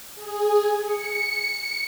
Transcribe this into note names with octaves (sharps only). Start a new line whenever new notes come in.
G#4
C#7